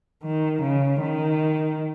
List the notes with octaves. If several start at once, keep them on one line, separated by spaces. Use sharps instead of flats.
D#3
C#3
D#3